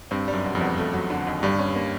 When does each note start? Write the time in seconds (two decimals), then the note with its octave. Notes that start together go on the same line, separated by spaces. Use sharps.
0.11 G2 C4
0.28 G3
0.33 F#2
0.45 B2
0.55 F2
0.61 E2
0.78 A3
0.93 F#3
1.10 D3
1.27 D#2
1.43 G2 G3
1.59 C#4
1.76 A#3